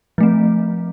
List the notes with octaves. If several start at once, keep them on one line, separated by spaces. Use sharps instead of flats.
F3 A3 C4